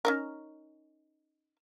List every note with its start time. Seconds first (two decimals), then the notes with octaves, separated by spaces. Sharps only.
0.05 C#4 D#4 A#4